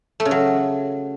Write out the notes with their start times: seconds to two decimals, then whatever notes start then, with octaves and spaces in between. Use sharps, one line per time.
0.20 A3
0.25 C#3
0.31 F#3